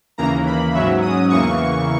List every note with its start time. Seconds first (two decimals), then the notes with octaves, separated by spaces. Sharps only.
0.18 D#2 C#3 E3 A#3 A#5
0.46 B5
0.74 G#2 F#3 C#4 E5
1.02 D#6
1.30 E2 C#3 E3 A#3 C#6